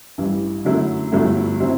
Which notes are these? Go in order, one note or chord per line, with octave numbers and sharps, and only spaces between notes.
A1 G2 E3
F#2 D3 F#3 A3 E4
G1 G2 F#3 A3 E4
F#3 C4 E4